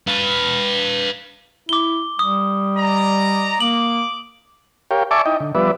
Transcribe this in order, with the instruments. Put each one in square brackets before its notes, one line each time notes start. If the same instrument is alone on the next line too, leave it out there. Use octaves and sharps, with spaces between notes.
[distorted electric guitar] B4 F5
[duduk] E4 [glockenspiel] D6 G7
[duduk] G3 [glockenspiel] D#6
[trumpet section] D5 D#5 A#5
[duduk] A#3 [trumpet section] D6 [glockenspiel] F#7
[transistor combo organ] G4 A#4 C#5 F5 G5
D5 E5 G#5 A5 C#6 D6
D#4 E4 D#5 G5
D3
F3 G3 B3 B4 D5 E5